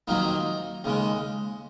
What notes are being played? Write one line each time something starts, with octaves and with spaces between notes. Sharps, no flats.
F2 D#3 F#3 A#3 D#4
D#2 C#3 G#3